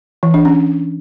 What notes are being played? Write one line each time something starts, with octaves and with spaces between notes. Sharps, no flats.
E3
D4
C#4